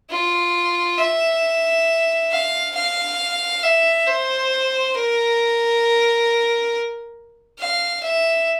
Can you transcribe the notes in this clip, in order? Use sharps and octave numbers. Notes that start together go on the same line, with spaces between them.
F4
E5
F5
F5
E5
C5
A#4
F5
E5